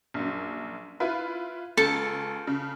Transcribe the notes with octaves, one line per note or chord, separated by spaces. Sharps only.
A#1 F#2
E4 F4 B4
C#2 A4 A5
C#3